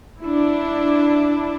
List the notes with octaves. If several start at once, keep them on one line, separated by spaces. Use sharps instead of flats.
D4 E4